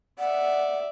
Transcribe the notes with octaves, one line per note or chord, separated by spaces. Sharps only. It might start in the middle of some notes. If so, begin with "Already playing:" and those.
D5 E5 F#5